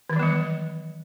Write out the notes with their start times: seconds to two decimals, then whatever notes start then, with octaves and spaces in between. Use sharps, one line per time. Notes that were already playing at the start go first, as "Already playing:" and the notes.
0.10 D#3
0.13 E3
0.16 F#3
0.19 B3
0.23 G3